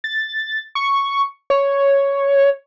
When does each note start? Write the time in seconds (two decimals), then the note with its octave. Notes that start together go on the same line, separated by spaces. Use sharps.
0.04 A6
0.75 C#6
1.50 C#5